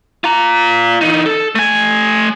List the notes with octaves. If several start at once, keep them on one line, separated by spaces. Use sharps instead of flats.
F4 A#5
E3 D#4
A4
A3 G#5